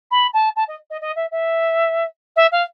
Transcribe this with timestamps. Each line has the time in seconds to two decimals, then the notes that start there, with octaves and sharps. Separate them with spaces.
0.11 B5
0.33 A5
0.56 A5
0.68 D#5
0.90 D#5
1.01 D#5
1.16 E5
1.31 E5
2.36 E5
2.52 F5